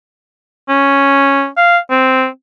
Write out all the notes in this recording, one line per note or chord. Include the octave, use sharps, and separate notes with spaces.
C#4
F5
C4